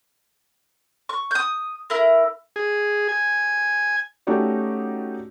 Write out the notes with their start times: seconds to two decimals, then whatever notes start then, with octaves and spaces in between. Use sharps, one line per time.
1.09 C#6
1.31 D#6 G6
1.90 E4 A#4
2.56 G#4
3.09 G#5
4.27 A3 C#4 D#4 F#4 G4 D5